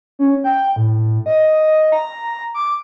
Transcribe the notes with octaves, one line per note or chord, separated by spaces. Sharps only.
C#4
G5
A2
D#5
A#5
D6